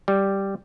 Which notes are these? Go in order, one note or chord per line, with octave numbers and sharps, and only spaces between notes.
G3